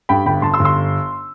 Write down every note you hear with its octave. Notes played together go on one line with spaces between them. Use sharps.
G2 G5 B5
G1 G5 B5
G1 A5 C6
C6 E6
G1
C6 E6